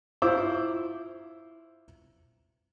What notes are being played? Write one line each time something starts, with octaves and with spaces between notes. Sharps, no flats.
E4 F4 C5 D6 E6